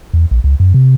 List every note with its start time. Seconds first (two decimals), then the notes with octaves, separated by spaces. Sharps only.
0.14 E2
0.31 A#1
0.44 C#2
0.60 F#2
0.74 C3